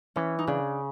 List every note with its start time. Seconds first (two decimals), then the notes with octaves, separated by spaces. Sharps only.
0.16 E3 C#4
0.39 D#4
0.47 C#3 D4